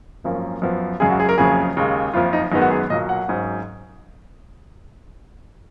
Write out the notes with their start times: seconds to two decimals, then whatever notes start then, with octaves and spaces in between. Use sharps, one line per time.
0.24 G#1 F#2 F3 A#3 C#4
0.62 F#2 F3 B3
1.00 F#2 C#3 G#3 G#4
1.10 F#4
1.20 G#4
1.29 A#4
1.38 F#1 F2 C#3 F#3 C#4 G#4
1.77 D#2 C#3 G#3
2.13 F#1 F2 F3 F4
2.33 D#4
2.52 F#2 D#3 G#3 B3 D#4
2.61 F#4
2.70 G#4
2.80 B4
2.90 B1 A#2 F#3 D#5
3.09 F#5
3.28 G#1 G#2 F#3 C#4